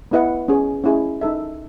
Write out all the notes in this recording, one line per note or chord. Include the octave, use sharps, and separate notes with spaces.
B3 E4 B4 D#5 F#5
C#4 G#4 C#5
C#4 E4 G#4 D#5
D#4 A4 E5